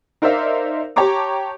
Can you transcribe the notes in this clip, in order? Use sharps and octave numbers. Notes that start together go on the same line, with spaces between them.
D#4 A#4 C5 D5 E5 F5
G4 C#5 A5 A#5 D6